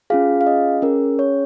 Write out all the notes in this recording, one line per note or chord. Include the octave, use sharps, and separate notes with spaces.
C#4 F4 G#4 F5
F5
D#5
C#4 G#4 A#4
C#5